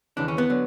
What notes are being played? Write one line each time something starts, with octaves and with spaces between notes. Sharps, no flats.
D#2 C#3 E3 D4
C#4
B3
D3 F#3